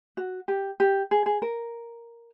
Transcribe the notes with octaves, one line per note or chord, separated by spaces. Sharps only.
F#4
G4
G4
G#4
G#4
A#4